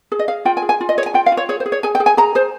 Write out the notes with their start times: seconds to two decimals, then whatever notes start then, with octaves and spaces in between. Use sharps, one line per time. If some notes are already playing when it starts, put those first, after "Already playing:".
0.12 G#4
0.19 D#5
0.28 G#4 F5
0.45 F4 G5
0.57 G#5
0.62 G#4
0.69 G#5
0.81 F4
0.89 D#5
0.97 G#4 C#5
1.06 G#5
1.14 F4 G5
1.26 F5
1.32 F4
1.37 C#5
1.49 G#4 C#5
1.60 C5
1.66 G#4
1.72 C#5
1.83 G#4 G#5
1.95 G5
2.00 G#4
2.06 G#5
2.17 G#4 A#5
2.35 G#4 C5